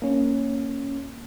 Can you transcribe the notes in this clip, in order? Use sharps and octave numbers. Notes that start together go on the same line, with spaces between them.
A#3 C#4